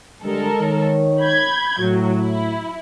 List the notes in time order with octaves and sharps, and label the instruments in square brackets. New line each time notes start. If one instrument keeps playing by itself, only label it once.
[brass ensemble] D3 G3 [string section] G#3 A4 A#4
[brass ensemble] D#3 C#5
[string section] B5 G6 G#6
[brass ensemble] A2 [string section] F#3
[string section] E4